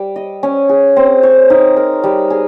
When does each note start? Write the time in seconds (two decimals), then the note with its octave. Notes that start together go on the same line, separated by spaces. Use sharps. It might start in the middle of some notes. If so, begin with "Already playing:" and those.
Already playing: G3
0.16 D#5
0.43 C#4
0.69 G#4
0.96 C4
1.23 C#5
1.50 D#4
1.77 A#4
2.04 G3
2.30 G#4